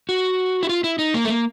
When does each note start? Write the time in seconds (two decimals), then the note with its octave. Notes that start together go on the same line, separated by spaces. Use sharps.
0.09 F#4
0.63 E4
0.69 F4
0.84 E4
0.99 D#4
1.14 A#3
1.25 A3
1.29 A#3